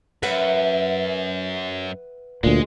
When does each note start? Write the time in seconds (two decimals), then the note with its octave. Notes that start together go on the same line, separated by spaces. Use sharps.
0.23 F#2 B4 E5 F#5
2.44 D2 A#2 G#3